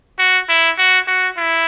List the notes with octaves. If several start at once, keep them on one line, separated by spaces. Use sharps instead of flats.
F#4
E4
F#4
F#4
E4